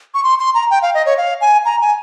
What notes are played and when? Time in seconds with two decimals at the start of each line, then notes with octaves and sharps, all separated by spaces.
0.14 C#6
0.24 C6
0.39 C6
0.54 A#5
0.70 G5
0.82 F5
0.94 D#5
1.06 C#5
1.17 F5
1.41 G#5
1.65 A#5
1.81 G#5